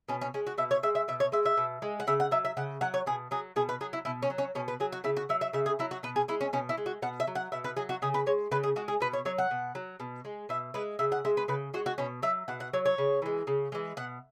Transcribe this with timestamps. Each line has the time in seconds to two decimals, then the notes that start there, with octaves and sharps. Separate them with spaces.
0.09 B2 C#4
0.21 C#4
0.34 G#3 C#4
0.47 F#4
0.58 B2 E5
0.71 C#5
0.83 G#3 E5
0.95 E5
1.08 B2 E5
1.20 C#5
1.32 G#3 E5
1.45 E5
1.57 B2
1.82 G#3
2.00 F#5
2.07 C#3 E5
2.20 F#5
2.31 F#3 E5
2.45 E5
2.57 C#3 F#5
2.81 F#3 F#5
2.94 C#5
3.06 B2 G#4
3.31 F#3 G#4
3.56 B2 G#4
3.69 B4
3.81 F#3 G#4
3.93 E4
4.05 B2 E4
4.22 C#4
4.30 F#3
4.38 C#4
4.55 B2 C#4
4.68 B4
4.80 F#3 G#4
4.92 F#4
5.04 C#3 E4
5.17 F#4
5.29 F#3 E5
5.41 E5
5.53 C#3 E5
5.66 G#4
5.79 F#3 E4
5.91 F#4
6.03 B2 B4
6.16 G#4
6.28 G#3 E4
6.41 C#4
6.53 B2 C#4
6.69 E4
6.77 G#3
6.86 F#4
7.02 B2 F#5
7.20 E5
7.27 F#3
7.35 F#5
7.52 B2 E5
7.64 B4
7.77 F#3 G#4
7.89 F#4
8.02 C#3 G#4
8.14 B4
8.26 G#3 C#5
8.51 C#3 B4
8.63 G#4
8.76 G#3 F#4
8.88 G#4
9.00 B2 B4
9.13 C#5
9.25 F#3 C#5
9.38 F#5
9.51 B2
9.75 F#3
10.00 B2
10.25 G#3
10.49 B2 E5
10.74 G#3 B4
10.99 C#3 E5
11.12 F#5
11.25 G#3 E5
11.37 B4
11.48 C#3 B4
11.74 G#3 F#4
11.86 F#4
11.98 B2 C#4
12.22 F#3 E5
12.48 B2 F#5
12.60 F#5
12.73 F#3 C#5
12.86 C#5
12.98 C#3
13.22 E3 G#3
13.47 C#3
13.72 E3 G#3
13.97 B2 F#5